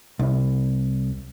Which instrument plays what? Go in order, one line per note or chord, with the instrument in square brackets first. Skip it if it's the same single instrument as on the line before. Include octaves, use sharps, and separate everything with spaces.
[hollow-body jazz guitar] C2